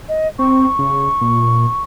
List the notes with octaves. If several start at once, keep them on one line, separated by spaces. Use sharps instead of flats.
D#5
C4 C#6
C#3
A#2